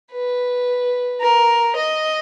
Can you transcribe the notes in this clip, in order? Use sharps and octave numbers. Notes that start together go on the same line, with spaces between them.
B4
A#4
D#5